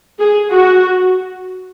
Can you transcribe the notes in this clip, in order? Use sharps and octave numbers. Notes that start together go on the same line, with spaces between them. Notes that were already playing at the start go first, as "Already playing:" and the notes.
G#4
F#4